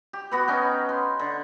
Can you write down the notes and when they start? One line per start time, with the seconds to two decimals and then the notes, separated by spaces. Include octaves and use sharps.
0.13 G4
0.31 B3 F#4 B4
0.48 C#4 D#4 G5
0.89 C6
1.19 D3